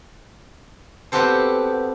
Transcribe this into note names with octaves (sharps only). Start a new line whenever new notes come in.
B3 C4 F#4 G4 A4 C5